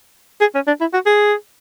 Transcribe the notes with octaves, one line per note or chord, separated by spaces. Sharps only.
G#4
C#4
D4
E4
F#4
G#4